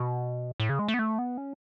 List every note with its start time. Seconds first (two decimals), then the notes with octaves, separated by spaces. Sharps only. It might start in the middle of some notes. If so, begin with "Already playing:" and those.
Already playing: B2
0.60 A2
0.69 C#3
0.79 G#3
0.88 A3
0.94 B3
0.99 A3
1.19 B3
1.38 C#4